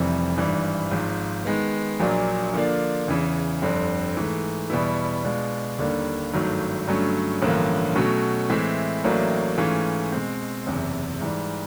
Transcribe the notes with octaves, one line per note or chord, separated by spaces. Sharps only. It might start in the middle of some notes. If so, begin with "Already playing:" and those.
Already playing: F1 F2 C3 E3 G3
G#1 G2 E3 G3
G#1 G#2 F3
D#3 G#3 B3
A#1 A#2 F#3 A#3 D4
D3 F3 A#3 D4 F4
E2 C#3 E3
G1 F2 D3 G3 C4
G#2 E3 A3
E2 B2 G3 B3 E4
B2 G#3 B3 D4 F4
D#2 D3 G3 A#3
G#1 G2 D#3 F#3 A3
G2 D3 F#3 A3 C#4
A1 G2 D3 F3 A#3
B2 F#3 A3 C#4 F#4
A2 E3 G#3 C4 E4
A1 A2 F#3 A#3 D4
G#2 E3 A3 C#4 F4
B2 G#3 C4
F#1 E2 C3
G#2 E3 G3